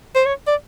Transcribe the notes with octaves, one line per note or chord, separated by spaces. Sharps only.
C5
C#5
D5